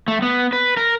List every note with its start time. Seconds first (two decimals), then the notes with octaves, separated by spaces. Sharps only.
0.08 A3
0.22 B3
0.53 B4
0.77 A#4